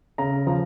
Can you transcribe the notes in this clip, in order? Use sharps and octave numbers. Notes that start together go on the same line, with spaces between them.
C#3 A#5
F3 A#5